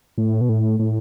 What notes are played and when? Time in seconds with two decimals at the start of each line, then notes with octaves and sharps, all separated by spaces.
0.18 A2
0.41 B2
0.49 A2
0.79 A2